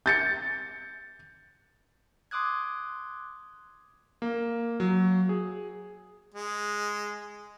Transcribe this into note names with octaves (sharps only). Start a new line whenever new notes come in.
G6 A6 C#7
C6 D6 D#6 F#6 G#6
A#3
F#3
G#4
G#3